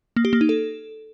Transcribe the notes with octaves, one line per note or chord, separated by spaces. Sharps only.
A#3
G4
A#3
D#4
A4